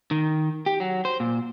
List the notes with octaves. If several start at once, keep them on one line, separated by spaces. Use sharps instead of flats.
D#3
G4
F#3
C5
A#2